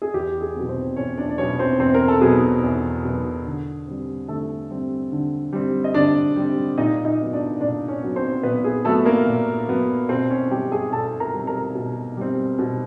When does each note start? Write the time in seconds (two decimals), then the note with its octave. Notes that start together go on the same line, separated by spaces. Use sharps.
0.02 G#4
0.14 E2 G4
0.41 G#4
0.55 B2 F#3 B3
0.69 C4 C5
0.96 E2 C#4 C#5
1.17 D4 D5
1.29 D5
1.38 B2 F#3 B3 C#4 C#5
1.59 C4 C5
1.80 E2 C4 C5
1.94 A#4
2.08 A4
2.21 B2 F#3 B3 G#4
2.63 E2
3.05 B2 F#3 B3
3.46 D3
3.87 G3 C4
4.28 D3 A3 A4
4.71 G3 C4
5.12 D3
5.53 G3 C4
5.84 D#5
5.94 D3 D4 D5
6.36 G3 C4
6.78 A#2 D#4 D#5
7.05 D#4 D#5
7.19 F#3 B3
7.33 D4 D5
7.60 A#2 D4 D5
7.88 C#4 C#5
8.02 F#3 B3
8.16 C4 C5
8.43 A#2 B3 B4
8.64 G#4
8.85 F#3 A3 B3 A4
9.05 A#3 A#4
9.27 A#2
9.68 F#3 B3
10.09 B2 C4 C5
10.30 C#4 C#5
10.51 G3 C4 G4 G5
10.72 G#4 G#5
10.92 B2 A4 A5
11.20 A#4 A#5
11.34 G3 C4
11.47 A#4 A#5
11.75 B2
12.17 G3 C4
12.59 B2